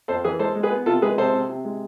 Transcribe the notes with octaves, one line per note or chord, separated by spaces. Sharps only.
F2 A4 C5
E3 G#4 B4
G#3 A4 C5
G#3
G#4 B4
B3
C3 F4 A4
G#3 G#4 B4
C3 A4 C5
C3
C3
G#3